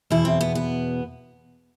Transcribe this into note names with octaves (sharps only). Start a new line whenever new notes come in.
E2 B2 E4
C4
B3
B3